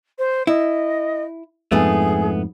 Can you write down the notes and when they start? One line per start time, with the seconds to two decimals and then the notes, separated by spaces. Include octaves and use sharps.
0.18 C5
0.47 E4 D#5
1.72 F2 G#2 A3 B3 G#4